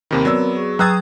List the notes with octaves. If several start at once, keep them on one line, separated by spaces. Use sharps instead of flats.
D#2 C3 D#3 C4 A#4 B5
F#3 B3 D5 E6
G#4 C#6
F#3 G5 A#5 D#6 E6 F#6 G#6 A6